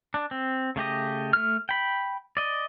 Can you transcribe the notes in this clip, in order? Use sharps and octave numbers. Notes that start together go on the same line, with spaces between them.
D4
C4
C#3 A3 G4 D#5
A3 F6
G5 B5
D5 D#5